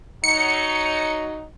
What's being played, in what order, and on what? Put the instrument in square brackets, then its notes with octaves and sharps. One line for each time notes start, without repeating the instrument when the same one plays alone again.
[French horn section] F#3 D#4 [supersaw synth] C#7